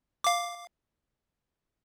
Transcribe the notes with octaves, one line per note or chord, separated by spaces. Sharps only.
F5 D6